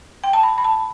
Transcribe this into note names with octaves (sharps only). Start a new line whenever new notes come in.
G5
A5
B5
B5
A5